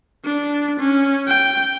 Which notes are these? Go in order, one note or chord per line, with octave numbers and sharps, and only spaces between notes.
D4
C#4
G5